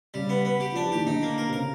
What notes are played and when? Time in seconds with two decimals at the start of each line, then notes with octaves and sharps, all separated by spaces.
0.14 C#3 G3
0.29 B3
0.45 B3
0.60 G4
0.72 F3 D4
0.84 E3
0.92 D#3 G4
1.06 D3 D#4
1.23 A#3
1.38 A#4
1.49 C3
1.53 C#3 A#4